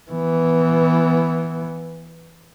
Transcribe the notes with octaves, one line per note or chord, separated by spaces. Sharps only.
E3 B3